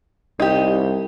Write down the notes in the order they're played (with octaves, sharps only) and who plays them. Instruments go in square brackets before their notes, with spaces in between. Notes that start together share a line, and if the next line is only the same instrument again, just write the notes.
[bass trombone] C2 [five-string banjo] D#4 G4